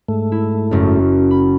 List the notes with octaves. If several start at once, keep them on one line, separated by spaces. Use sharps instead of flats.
G#2 A3
E4
F#1 F#2
B5